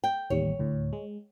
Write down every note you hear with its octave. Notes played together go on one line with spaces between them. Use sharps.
G5
A1 D#2 G3 C#5
D2 A2
G#3